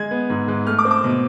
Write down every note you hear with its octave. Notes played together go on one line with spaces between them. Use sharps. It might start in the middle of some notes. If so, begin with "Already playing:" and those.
Already playing: G#3 G#6
B3
G#2
G#2
A3 F6
D6
C4
D6
B2